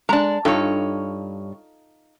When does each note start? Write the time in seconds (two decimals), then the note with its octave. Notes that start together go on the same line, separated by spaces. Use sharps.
0.09 G#3 D4 A5 A#5
0.45 G2 D#4 F4 A4 C#5